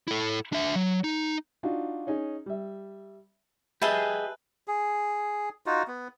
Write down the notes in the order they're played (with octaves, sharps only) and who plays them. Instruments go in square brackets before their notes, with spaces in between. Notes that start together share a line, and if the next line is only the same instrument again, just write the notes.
[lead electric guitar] E4 A4
D4 E5
F#3
D#4
[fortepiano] D4 D#4 F4 F#4
C#4 D#4 G#4
G3 E5
[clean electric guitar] G4 G#4 D#5 [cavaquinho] B4 E5 A5
[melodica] G#4
D#4 F4 F#4
B3